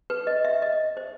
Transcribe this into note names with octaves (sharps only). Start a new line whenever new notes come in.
B4
D#5
E5
D#5
C5